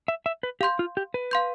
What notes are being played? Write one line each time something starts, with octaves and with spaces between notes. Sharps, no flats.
E5
E5
B4
G4 F5 C6 G6
F4
G4
B4
F5 C6 G6